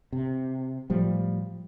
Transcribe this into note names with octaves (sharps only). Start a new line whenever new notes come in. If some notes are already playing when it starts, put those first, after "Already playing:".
C3
A2 F3 G3